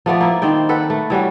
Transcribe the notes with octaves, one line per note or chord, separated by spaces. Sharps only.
F3 A3 B3 D5
A#3 E4
D#3 C4 D5 G5
A4 B4 F#5
A3
E3 G3 C#4 F#4